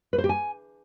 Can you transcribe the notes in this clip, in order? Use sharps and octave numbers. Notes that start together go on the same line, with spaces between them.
B4
C5
G4
G#5